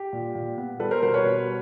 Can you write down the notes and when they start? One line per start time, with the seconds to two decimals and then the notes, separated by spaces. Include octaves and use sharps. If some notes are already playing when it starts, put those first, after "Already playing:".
Already playing: G4
0.13 A#2
0.35 A#2
0.58 B3
0.80 G3 A4 B4
0.91 A#4 C5
1.02 B2 A#4 C5
1.14 B4 C#5
1.25 B2